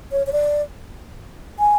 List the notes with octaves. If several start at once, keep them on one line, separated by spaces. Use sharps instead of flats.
C#5
C#5
D5
G#5